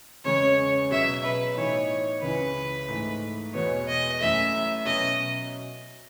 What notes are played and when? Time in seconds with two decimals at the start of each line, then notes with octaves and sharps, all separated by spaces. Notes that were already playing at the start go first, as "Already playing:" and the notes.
0.24 E2 C#3 G#3 C#4 C#5
0.91 B2 F#3 C#4 G#4 E5
1.24 B4
1.56 A2 E3 B3 D#4 C#5
2.22 C#2 C#3 E3 B4
2.88 G#2 E3 A3
3.54 E2 B2 G#3 B3 F#4 C#5
3.88 D#5
4.20 F#2 E3 A3 E5
4.86 B2 F#3 C#4 D#5